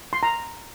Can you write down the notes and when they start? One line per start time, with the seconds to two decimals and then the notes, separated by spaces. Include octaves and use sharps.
0.13 C6
0.23 A#5